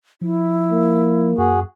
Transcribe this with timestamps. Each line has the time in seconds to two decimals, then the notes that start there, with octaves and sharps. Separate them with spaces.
0.21 F3 E4
0.72 A#3
1.38 F#2 F#4 G#4